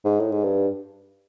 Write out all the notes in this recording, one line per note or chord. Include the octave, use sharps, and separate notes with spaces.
G#2
A2
G#2
G2